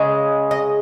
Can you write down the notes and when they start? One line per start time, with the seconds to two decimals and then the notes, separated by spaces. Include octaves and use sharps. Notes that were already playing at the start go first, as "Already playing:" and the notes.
Already playing: C#3 G#3
0.51 D#5